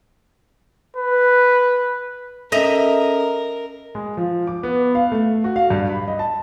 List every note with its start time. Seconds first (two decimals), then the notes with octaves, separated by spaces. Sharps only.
0.97 B4
2.52 C#4 A4 A#4 D#5 E5 A#5
3.95 G#3
4.17 F3
4.47 D6
4.63 B3
4.95 F5
5.12 A3
5.44 F#4
5.56 F5
5.70 G2
5.89 B5
6.08 D#5
6.19 A5